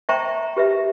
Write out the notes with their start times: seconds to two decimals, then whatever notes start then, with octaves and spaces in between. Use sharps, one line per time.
0.09 C5 E5 G5 A#5 C#6
0.57 G4 B4 E5